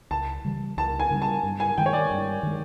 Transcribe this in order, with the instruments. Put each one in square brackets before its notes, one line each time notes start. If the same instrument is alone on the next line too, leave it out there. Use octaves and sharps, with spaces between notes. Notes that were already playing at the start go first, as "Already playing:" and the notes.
[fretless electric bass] C#2 [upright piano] A5
[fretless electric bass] C#3 E3 G3
[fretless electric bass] C#2 [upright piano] A5
[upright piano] G#5
[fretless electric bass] C#3 E3 G3
[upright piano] A5
[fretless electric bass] G2
[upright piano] G#5
[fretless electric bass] D#3 G#3 [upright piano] G5
[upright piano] C#5
D5
[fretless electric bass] G2
D#3 G#3